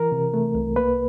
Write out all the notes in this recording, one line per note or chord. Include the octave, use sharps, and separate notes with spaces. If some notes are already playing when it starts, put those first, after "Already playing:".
Already playing: E3 A#4
C3
A3
C2
A#3 B4